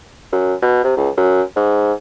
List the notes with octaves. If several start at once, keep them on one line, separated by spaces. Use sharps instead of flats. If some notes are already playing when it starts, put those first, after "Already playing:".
F#2
B2
C3
C#2
F#2
G#2